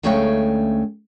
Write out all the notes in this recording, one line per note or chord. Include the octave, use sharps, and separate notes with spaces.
D2 G#3 A3 C#4 F5 G5